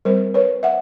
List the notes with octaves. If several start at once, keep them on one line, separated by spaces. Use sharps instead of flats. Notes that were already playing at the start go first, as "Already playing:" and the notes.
G3 C4 A#4 C5
B4 C#5
E5 F#5